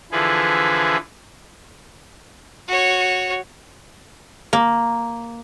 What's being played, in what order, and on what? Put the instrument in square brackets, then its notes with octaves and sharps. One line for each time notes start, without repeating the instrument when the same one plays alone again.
[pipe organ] D3 E3 F3 G#4 B4
[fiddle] F#4 C#5
[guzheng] A#3